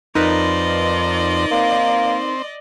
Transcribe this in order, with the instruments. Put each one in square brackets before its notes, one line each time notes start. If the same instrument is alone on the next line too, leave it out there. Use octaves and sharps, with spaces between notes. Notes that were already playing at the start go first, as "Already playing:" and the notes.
[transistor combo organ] F2 C4 [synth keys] D#4 A#4 B4 [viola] D5 D#5
[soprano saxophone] A#3 [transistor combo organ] C4